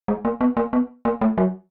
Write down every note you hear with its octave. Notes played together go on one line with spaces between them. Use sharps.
G#3
A#3
B3
A#3
B3
A#3
A3
F#3